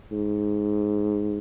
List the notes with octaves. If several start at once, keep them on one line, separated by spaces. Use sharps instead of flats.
G#2